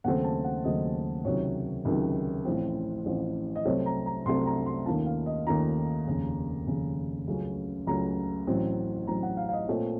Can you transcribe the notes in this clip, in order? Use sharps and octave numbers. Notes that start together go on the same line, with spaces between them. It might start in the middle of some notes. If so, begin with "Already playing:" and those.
D#2 C#3 F#3 A3 C4 F#5
A5
F#5
D#2 C#3 F#3 A3 C4 D#5
C#2 C3 D#3 F#3 C#5
C#2 C3 D#3 F#3
A1 A2 F3 C4
A1 A2 F3 C4
D#5
C2 C3 F#3 A3 C4 C#5
A#5
A#5
C2 C3 F#3 A3 C4 C6
A#5
C6
D#2 D#3 A3 C#4 F4 A5
F5
D#5
D#2 D#3 A3 C#4 F4 A#5
F1 D#2 C#3
F1 D#2 C#3
C#2 C#3 F#3 A3 C#4
C#2 C#3 F#3 A3 C#4 A#5
A1 A2 F#3 C4
A1 A2 F#3 C4 A#5
F#5
F5
F5
D#5
A#2 A3 C4 C#5